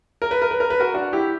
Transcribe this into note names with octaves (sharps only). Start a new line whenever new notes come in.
A#4
B4
A#4
B4
A#4
B4
F#4 A#4
D4 F#4
E4 G4